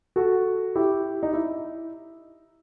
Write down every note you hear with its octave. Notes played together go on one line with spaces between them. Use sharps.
F#4 A4
E4 G4
D#4
E4